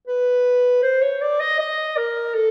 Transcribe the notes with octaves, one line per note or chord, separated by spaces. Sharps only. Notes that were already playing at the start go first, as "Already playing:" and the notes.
B4
C5
C#5
D5
D#5
D#5
A#4
A4